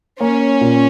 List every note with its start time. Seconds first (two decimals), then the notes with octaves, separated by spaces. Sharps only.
0.20 A#3 C#4
0.61 A#2